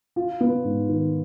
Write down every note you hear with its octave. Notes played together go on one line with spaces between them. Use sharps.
F4
B3
G#2
D#3